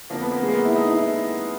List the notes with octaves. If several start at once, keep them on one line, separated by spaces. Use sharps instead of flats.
F2 D3 F3 A#3
B3
A#3
G#3
A#3
B3
E4
D#4
E4
E4